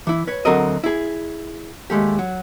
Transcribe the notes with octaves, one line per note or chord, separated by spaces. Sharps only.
E3 E4
B4 C#5
D2 F#3 C4 A4 A#4 D#5
E4 G#4
D#2 G#3 A3 G4
F#3